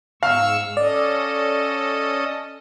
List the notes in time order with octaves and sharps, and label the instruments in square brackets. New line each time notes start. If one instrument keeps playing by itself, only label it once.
[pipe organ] G#2 C#6 E6 [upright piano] F5 F6
[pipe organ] C#4 A4 D#5 [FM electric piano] D5